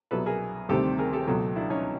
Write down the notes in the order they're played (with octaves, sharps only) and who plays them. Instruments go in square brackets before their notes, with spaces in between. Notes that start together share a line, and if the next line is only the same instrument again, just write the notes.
[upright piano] C2 B2 F#3 [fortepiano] A4 B4
[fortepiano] G#4 A#4
[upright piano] D2 C3 D#3 G3 C4 [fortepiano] G4 A4
[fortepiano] G#4 A#4
G4 A4
[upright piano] C#2 B2 F#3 A3
[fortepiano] D4 E4
C#4 D#4